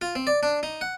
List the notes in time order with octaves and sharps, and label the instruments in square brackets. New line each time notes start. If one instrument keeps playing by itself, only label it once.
[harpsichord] F4
C4
D5
D4
D#4
F#5